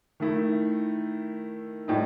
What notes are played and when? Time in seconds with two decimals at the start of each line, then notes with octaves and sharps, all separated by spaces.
0.20 D#3 A3 E4
1.88 A2 G3 D#4